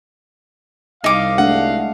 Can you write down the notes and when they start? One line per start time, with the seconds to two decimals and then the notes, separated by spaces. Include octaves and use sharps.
1.04 C2 D#4 F5 D6
1.38 G#3 A3 D4 F#5